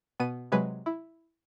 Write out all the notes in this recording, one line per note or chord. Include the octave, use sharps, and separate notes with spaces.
B2 B3 D#7
C3 F#3 G#3 B4
E4